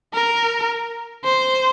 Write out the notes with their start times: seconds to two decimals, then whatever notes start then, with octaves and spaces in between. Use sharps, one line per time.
0.14 A#4
1.25 C5